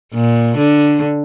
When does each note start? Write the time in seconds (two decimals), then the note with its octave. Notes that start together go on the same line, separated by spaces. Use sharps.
0.14 A#2
0.57 D3